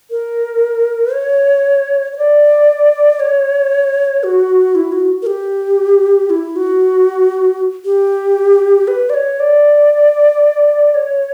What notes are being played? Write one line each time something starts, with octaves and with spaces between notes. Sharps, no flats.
A#4
C#5
C#5
D5
C#5
F#4
E4
F#4
A#4
G4
E4
F#4
G4
B4
D5
C#5
D5
C#5